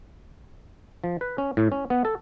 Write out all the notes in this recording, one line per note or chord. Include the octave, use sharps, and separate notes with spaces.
F3
B4
C#4
A2
C#4
B3
A4